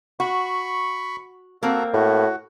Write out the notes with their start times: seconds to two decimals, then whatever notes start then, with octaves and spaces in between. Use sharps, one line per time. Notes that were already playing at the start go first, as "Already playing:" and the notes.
0.20 F#4 B5 C#6
1.63 A#3 C4 F#4 A4 A#5
1.94 A2 F#4